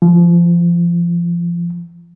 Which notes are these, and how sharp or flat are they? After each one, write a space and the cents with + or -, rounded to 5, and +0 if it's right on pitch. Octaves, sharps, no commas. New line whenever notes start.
F3 -25